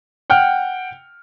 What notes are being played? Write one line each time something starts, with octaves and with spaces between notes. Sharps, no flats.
F#5 G5 F6